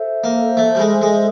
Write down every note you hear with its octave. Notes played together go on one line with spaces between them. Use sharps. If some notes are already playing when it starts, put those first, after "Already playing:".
Already playing: A4 C5 E5
A#3
A3
G3
G#3
G#3